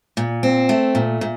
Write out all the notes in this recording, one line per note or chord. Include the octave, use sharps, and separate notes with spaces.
A#2
C4
A3
A#2
A#2